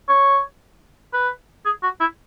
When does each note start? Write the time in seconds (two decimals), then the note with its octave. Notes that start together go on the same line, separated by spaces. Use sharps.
0.09 C#5
1.13 B4
1.65 G#4
1.83 F#4
2.00 E4